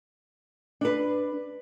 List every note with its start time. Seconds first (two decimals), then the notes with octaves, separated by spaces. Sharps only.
0.81 D4 B4